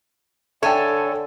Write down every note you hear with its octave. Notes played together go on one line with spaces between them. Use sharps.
D3 A4 C#5 E5 G5 G#5 E6